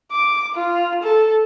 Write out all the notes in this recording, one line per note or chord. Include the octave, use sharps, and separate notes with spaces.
D6
F4
A4